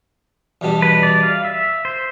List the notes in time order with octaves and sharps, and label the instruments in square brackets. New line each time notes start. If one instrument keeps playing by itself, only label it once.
[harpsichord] E2 B2 G3 D4
[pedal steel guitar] B4
D5
F5
E5
C5